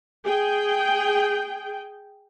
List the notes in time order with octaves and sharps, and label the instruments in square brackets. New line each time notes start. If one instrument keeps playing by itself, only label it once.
[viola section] G#4 G5